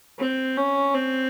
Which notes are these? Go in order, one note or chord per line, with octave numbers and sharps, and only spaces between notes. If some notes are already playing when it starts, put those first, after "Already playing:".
C4
C#4
C4